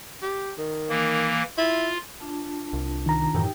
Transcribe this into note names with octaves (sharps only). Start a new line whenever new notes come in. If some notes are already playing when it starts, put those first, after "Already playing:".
G4
D#3
E3 A#3
E4 F4
D4 F4 A5
C2
D#3 A#5
F#2 A2 E3 D#4 G4 G5